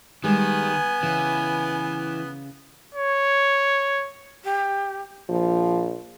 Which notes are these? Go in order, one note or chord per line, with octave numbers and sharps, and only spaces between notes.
D#3 G3 G#3 B3 G#5
C#3 E3
C#5
G4
A#1 F3